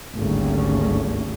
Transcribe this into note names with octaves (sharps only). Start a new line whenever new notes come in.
G#1 D2 G3 A3 A#3 C#4